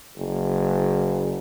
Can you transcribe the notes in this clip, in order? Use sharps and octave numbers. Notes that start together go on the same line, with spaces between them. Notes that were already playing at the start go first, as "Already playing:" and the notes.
F#1